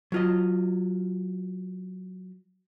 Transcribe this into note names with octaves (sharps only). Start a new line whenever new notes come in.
F#3 F4 D#5